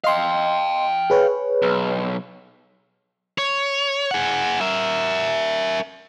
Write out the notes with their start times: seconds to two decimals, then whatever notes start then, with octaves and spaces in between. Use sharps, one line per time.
0.04 D#5 F5 G5 C6
1.10 G#4 B4 C#5
1.62 B1
3.38 C#5
4.11 G#4 F#5
4.61 A#4 E5